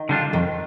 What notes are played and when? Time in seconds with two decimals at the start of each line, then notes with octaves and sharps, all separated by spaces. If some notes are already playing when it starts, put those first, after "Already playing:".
Already playing: D#3
0.09 D3 G3 D4 F4
0.33 F2 D#3